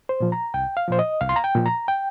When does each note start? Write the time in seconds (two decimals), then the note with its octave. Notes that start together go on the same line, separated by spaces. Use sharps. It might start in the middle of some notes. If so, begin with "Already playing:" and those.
0.09 C5
0.20 A#2 F3
0.32 A#5
0.54 C2 G5
0.77 F5
0.88 A#2 F3 C5
0.99 D#5
1.21 C2 F5
1.29 C6
1.36 A#5
1.44 G5
1.55 A#2 F3
1.66 A#5
1.88 G5